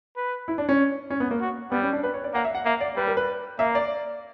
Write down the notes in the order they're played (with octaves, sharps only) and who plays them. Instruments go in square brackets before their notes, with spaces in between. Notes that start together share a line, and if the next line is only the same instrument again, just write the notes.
[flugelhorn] B4
[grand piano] E4
D4
C#4
C#4
B3
A#3
[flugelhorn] F#4
[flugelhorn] G3 [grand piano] B3
[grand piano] C#4
D4
B4
C#5
D5
[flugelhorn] A#3 [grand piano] F#5
[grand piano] E5
F#5
[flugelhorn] A#3 [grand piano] E5
[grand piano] D5
[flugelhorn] G3 [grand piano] B4
[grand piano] A#4
B4
[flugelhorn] A#3 [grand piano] E5
[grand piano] D5